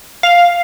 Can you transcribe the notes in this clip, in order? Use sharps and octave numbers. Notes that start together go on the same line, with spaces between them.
F5